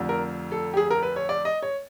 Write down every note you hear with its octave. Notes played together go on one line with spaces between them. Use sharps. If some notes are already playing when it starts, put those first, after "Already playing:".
Already playing: F1 F2 D3
A#4
A4
G4
G#4
A#4
B4
C#5
D5
D#5
C#5